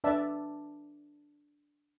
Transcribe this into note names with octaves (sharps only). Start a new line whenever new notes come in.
D4 B4 D5 E5 A5